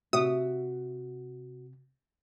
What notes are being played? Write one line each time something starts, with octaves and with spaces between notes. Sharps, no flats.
C3 F#4 E5 D#6